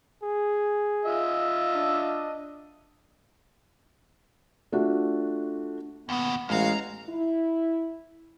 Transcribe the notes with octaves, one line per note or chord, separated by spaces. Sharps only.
G#4
F4 D#5 E5
D4
A3 D4 F4 F#4
D#2 B2 B3
A1 E2 G#3 F#4 F5 A#5
E4